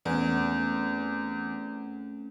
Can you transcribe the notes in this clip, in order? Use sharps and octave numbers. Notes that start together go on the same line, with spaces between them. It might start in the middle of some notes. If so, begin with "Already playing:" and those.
E2 A3 C4 C#4